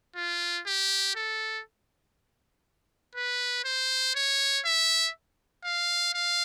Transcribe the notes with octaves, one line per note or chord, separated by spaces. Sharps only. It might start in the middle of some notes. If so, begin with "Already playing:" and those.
F4
G4
A4
B4
C5
C#5
E5
F5
F5